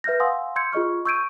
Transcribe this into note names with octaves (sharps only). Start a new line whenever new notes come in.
B4 E5 F6 G6 A#6
F5 F#5 G#5 C6 D#6 E6
C6 E6 G6 G#6 C#7
F4 G#4 D#5 C#6 F6
C#6 E6 G6 G#6 D7 D#7